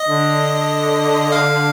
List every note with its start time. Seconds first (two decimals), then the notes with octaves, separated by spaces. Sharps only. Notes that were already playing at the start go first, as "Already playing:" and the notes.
Already playing: D#5
0.08 D3
1.32 F5